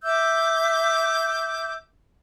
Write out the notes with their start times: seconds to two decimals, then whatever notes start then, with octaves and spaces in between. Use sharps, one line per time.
0.04 E5 D6 E6 G6